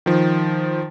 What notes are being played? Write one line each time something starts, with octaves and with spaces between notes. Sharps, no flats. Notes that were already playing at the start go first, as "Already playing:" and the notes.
D#3 F3